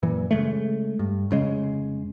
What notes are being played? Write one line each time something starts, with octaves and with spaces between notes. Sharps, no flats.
F#2 A#2 E3
C#3 G#3 A3
G2
F1 C#3 G#3